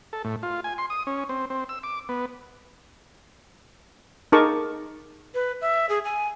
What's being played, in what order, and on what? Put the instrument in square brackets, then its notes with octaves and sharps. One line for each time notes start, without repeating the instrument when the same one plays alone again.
[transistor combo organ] A4
A2
F4
G#5
C6
D#6
C#4
C4
C4
E6
D6
B3
[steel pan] D#4 G#4 A#4 A5 C#6 D6
[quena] B4
E5
G#4
G#5